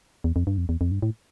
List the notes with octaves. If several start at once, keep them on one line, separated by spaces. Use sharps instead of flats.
E2
F2
G2
F2
E2
F2
G2
A2